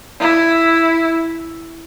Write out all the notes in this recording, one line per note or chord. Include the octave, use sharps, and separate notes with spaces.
E4